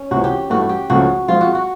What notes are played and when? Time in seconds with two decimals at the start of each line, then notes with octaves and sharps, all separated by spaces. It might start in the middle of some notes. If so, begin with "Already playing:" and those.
Already playing: C#4
0.11 C#2 C3 E3 F#4
0.24 G4
0.50 G2 E3 A3 F#4
0.69 G4
0.90 C#2 C#3 F3 A3 F#4
1.28 F3 G#3 C4 F4
1.41 F#4
1.55 F#4